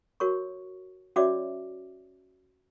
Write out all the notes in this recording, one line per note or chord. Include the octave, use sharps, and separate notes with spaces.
F#4 A#4 C#5 C#6
C#4 F#4 C#5 D5 E5 D6